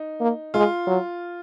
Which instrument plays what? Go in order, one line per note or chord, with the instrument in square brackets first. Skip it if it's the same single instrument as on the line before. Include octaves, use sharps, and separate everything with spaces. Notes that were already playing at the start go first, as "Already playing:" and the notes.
Already playing: [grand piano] D#4
[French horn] A#3
[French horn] G#3 [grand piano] F4
[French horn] F#3